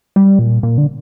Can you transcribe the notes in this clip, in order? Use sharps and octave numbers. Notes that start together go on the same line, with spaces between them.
G3
A#2
A#2
D3